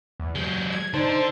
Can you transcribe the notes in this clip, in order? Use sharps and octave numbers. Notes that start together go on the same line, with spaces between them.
E2
F#3 G#3 G6
G#6
D3 D#4 C5 A5